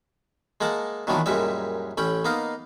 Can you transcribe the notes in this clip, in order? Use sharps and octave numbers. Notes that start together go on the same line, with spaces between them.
G#3 A#3 F#5 A5
A#2 D#3 E3 F#3 B3 D4
F#2 A#2 G3 G#3 E5
A1 C#4 G5 B5
A#3 B3 D#4 D#5 F5